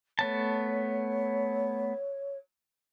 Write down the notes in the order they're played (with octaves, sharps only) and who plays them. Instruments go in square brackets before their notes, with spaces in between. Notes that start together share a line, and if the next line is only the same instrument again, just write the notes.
[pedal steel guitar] A3 B3 A5 [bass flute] C#5